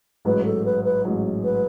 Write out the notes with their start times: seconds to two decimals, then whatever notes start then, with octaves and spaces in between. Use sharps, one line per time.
0.25 A1 G#2 F#3 B4
0.45 A4
0.65 B4
0.84 B4
1.05 A1 G#2 F#3
1.43 B4